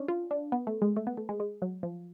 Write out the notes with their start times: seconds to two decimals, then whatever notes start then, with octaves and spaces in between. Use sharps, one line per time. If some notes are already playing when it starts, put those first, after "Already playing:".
Already playing: C#4 D4
0.08 F4
0.31 D4
0.52 B3
0.67 A3
0.82 G#3
0.96 A3
1.07 B3
1.17 A3
1.29 G#3
1.40 G#3
1.62 F#3
1.83 F3